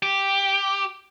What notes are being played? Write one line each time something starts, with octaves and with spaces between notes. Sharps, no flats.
G4